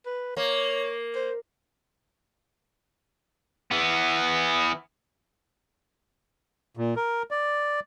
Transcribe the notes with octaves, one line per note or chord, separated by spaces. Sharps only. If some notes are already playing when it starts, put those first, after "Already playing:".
B4
A#3 C#5
C5
E3 B3
A#2
A#4
D5